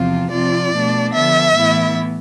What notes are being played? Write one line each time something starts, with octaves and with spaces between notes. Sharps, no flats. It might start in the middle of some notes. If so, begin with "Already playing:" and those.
Already playing: E2 C3 F3 C4 F4
C3 F3 C4 F4 D5
B2 A3 D4
D3 F3 B3 E5
A2 E3 B3 E4